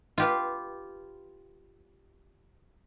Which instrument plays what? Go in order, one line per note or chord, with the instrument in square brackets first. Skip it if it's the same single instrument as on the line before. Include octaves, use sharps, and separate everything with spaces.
[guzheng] F4 G4 B4